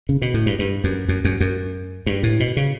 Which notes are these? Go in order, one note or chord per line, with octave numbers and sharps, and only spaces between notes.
C#3
B2
A2
G2
G2
F#2
F#2
F#2
F#2
G2
A2
B2
C#3